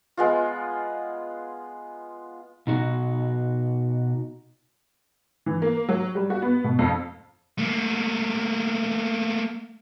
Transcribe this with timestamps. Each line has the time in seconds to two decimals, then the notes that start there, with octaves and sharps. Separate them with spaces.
0.17 G#3 B3 F4
2.67 B2 D#4 F#4
5.46 E3
5.62 A#3
5.89 F#3
6.15 G3
6.30 F#4
6.42 B3
6.64 B2
6.79 F2
7.58 A3 A#3